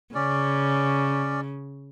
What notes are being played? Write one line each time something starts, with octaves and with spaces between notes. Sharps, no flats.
C#3 C#4 D5